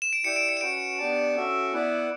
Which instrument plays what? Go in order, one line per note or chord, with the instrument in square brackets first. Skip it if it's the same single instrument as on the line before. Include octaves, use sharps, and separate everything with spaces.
[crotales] E7
D7
[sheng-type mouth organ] E4 G4 D5 G5 [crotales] C#7
[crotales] D7
C#7
E7
[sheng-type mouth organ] C#4 F#4 B4 [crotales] D7
[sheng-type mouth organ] B3 D4 G4 D5 A5
C#4 F#4 A4 E5
B3 E4 B4 D5 F#5